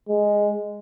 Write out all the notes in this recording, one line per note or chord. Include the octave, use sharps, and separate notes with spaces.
G#3